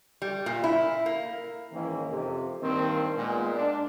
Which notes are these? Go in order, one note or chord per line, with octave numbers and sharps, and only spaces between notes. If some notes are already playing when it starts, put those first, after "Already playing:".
G3
A#2
E4
A#3
G#2 D#3 E3 A#3 C#4 E4
F2 C3
G2 D#3 A#3 C4
A#2 G#3 B3
D4